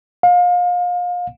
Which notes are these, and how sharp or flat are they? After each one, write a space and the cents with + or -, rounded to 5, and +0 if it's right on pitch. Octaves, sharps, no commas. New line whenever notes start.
F5 +30